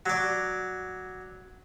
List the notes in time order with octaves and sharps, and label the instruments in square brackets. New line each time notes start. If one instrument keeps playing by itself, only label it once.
[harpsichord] F#3 D5